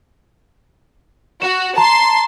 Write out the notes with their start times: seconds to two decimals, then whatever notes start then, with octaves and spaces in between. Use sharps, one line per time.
1.42 F#4 E7
1.78 A5 A#5 C6